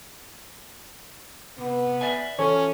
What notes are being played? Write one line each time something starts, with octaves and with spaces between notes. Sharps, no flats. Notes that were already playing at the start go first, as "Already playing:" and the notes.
C3 B3
D5 E5 G#5
E3 C#4 F4 A4 C#5